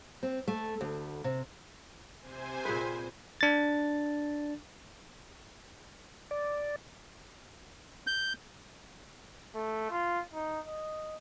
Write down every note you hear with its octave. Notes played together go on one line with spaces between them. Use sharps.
C4
A3
D2
C3
C3 C5 G#5
A#2 G#4 B4
D4 A6
D5
G6
A3
F4
D#4
D#5